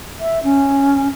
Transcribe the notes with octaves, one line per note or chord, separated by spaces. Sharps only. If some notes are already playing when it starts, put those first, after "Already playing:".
E5
C#4